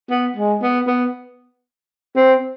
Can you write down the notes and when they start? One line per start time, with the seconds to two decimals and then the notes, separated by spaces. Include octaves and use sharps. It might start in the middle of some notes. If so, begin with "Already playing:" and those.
0.10 B3
0.36 G#3
0.62 B3
0.87 B3
2.16 C4